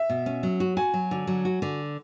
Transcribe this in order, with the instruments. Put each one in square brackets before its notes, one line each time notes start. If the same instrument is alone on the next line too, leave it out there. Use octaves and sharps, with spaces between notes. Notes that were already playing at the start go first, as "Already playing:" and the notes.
Already playing: [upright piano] E5
[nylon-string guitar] B2
C#4
F#3
F#4
[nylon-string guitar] F#4 [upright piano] G#5
[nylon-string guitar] F#3
D3
F#3
F#4
D3